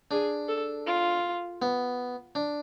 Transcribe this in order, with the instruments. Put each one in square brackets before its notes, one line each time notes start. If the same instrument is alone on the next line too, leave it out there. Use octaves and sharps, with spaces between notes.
[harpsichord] D4 [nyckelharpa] G#4
[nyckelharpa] A4
F4
[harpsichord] B3
D4